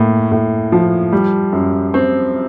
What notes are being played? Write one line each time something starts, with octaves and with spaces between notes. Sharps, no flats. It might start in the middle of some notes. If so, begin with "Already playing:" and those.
Already playing: A2 A#3
A2
F3
G3
F#2
C4